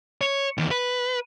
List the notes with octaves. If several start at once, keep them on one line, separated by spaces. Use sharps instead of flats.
C#5
E2 D#3
B4